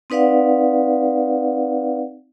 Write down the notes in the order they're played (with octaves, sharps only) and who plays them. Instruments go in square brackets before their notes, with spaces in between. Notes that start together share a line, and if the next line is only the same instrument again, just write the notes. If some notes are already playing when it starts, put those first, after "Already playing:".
[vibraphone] C4 D#4 B4 D5 F5 F#5